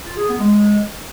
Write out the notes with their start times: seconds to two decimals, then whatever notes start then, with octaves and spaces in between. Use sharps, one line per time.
0.05 F4
0.17 G#4
0.28 B3
0.40 G#3